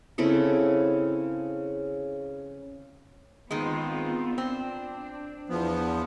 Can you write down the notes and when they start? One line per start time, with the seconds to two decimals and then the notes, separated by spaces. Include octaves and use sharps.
0.18 C#3 C4 E4 A4
3.51 D#3 G#3 B3 C4 F4
4.38 C4 D4
5.50 E2 F3 B3